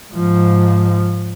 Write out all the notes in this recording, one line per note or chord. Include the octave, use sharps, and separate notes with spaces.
G#2 F3